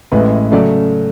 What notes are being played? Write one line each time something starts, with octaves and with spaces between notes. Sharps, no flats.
A1 A2 G#3 B4
C#3 F#3 A3 D5